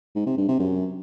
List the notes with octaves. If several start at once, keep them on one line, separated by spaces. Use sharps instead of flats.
G#2
C3
G2
C3
F#2